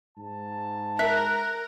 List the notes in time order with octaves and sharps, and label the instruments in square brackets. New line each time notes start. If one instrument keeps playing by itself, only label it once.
[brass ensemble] G#2 A5
[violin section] A#4 [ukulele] E5 [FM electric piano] F#6